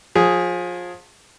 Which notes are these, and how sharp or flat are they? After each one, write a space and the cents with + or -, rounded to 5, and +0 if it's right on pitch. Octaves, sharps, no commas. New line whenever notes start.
F3 +30 G#4 +0